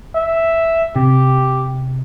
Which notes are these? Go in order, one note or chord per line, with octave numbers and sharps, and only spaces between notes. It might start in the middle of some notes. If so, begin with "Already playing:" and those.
E5
C3 G4